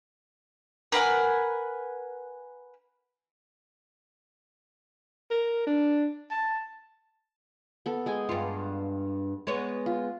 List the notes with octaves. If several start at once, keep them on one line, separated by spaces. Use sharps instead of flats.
A#4 B4 F#5 G#5
A#4
D4
A5
B3 A4
G#3 G5 G#5
G2 F4
G#3 B3 C#5
F4